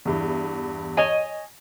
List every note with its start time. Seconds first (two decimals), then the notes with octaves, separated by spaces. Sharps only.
0.05 E2 G2 E3
0.97 C#5 D#5 G#5